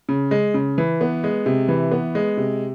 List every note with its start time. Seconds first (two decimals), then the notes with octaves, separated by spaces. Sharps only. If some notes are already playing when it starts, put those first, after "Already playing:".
0.09 C#3
0.31 G#3
0.54 C#3
0.78 E3
1.01 B3
1.24 G#3
1.46 C3
1.69 E3
1.91 B3
2.15 G#3
2.37 C3